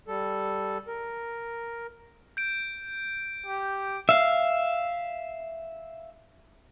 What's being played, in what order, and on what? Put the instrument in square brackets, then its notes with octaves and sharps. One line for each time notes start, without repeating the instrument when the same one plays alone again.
[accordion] G3 A4
A#4
[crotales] G6 D7
[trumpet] G4
[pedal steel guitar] E5 F5